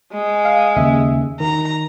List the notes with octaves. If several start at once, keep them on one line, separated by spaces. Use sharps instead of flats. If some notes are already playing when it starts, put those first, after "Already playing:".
G#3
F5
D#2 C#3 E5
D#3 A#5